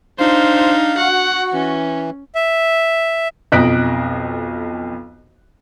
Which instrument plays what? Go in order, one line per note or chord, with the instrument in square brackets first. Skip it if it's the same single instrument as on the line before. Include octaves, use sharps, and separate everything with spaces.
[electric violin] D4 D#4 [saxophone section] F4 C5 [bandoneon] F5
[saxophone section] F#4 [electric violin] F#5
[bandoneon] E3 [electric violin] C#4
[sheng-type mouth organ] E5
[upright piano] B1 F2 D#5 F#6 B6 D7